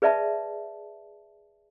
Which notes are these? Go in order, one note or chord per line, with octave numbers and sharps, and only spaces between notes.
G#4 B4 D5 E5 A5 B5